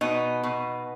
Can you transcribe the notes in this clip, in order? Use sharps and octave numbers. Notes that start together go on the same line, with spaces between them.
B2 B3 D#4
B2